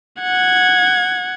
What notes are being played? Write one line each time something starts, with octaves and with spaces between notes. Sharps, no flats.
F#5 G#6